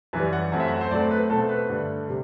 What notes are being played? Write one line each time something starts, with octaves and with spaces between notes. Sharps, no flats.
F#2 E3 G3 B4
F#5
F#2 F#3 A3 C4 F#5
E5
F#5
C5
A2 F#3 A3 C4 D5
B4
B2 A3 C4 A4
B4
G2 D3 A3
C3 G3